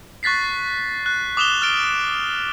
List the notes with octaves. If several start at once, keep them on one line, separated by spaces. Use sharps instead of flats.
C#6 F#6 A6 B6 C7
F#6
D6 D#6 E7 F7 G7
F6 A6 D7 G7